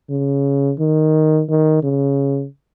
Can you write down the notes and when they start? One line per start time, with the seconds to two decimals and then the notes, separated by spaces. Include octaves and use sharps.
0.10 C#3
0.79 D#3
1.49 D#3
1.83 C#3